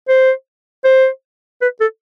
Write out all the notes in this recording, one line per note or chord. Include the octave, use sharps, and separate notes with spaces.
C5
C5
B4
A4